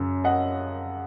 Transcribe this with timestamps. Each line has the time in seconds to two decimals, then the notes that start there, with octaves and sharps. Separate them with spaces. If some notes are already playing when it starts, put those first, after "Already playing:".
Already playing: F#2 C#3
0.24 D#5 F#5